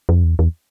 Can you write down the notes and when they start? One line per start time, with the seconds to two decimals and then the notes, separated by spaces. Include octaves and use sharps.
0.09 F2
0.24 E2
0.39 E2